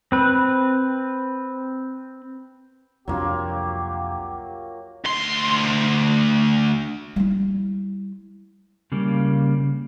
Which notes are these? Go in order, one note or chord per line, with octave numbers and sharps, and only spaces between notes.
C4 B4
C2 F2 F#3 A#3 D4 F4 G4
D2 C6
G3 E4
C#3 G3 A#3